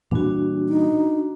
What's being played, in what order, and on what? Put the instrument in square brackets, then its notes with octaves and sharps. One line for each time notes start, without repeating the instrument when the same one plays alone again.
[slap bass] A#2 E3 G3 [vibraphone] D4 F#4
[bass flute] D#4